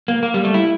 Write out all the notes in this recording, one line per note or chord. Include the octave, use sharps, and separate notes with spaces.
A#3
A#3
G3
A3
E4